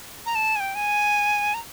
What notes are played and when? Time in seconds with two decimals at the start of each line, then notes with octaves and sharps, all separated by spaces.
0.26 A#5
0.35 A5
0.56 G#5
0.60 G5
0.75 G#5
1.54 A#5